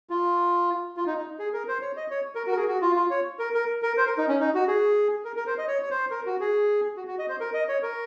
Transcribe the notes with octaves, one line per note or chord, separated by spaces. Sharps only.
F4
F4
D#4
D#4
G#4
A#4
C5
C#5
D#5
C#5
A#4
F#4
A#4
G#4
F#4
F4
F4
C#5
A#4
A#4
A#4
C5
A#4
D#4
C#4
D#4
F#4
G#4
A#4
A#4
C5
D#5
C#5
C#5
C5
A#4
F#4
G#4
F#4
F#4
D#5
C5
A#4
D#5
C#5
A#4